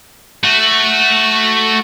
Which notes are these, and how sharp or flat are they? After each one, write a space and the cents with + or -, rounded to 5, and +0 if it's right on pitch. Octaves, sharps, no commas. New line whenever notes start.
A3 +0 F#4 +0